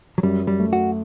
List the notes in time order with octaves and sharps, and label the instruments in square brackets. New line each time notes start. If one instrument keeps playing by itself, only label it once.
[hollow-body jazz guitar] F#3
[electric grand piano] F#2 [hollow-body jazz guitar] G3
[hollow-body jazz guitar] G3
[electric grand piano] A3
[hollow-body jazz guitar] F#4